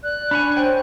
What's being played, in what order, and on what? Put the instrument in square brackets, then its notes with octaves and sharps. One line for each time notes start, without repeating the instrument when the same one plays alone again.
[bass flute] D5 [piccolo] F#6
[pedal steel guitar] D4 C#5 G#5 [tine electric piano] B5
[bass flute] C5 [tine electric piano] G5